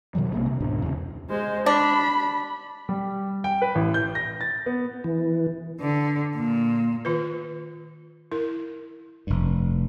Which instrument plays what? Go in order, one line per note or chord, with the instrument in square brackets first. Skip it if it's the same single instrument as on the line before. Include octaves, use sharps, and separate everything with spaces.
[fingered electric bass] B2 D#3 F#3 G3
B1 C3 G#3 A#3
C3
C#2 G#2 B2 D4
E2 C#3
[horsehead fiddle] G#3 C5
[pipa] D4 [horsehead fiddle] B5
[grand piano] G3
G5
B4
A1
G6
A#6
A6
B3
[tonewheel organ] E3
[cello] D3
A#2
[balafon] D#3 F4 B4
E4 A#4
[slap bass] F1 G2